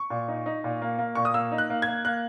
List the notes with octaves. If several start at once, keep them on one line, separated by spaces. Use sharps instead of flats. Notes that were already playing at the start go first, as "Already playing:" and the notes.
Already playing: C#6
A#2
D#4
D#4
A#2
A#3
A#3
A#2 C#6
D#6
A#3 E6
D#4
F#6
A#3
G#6
A#3
A#3 F#6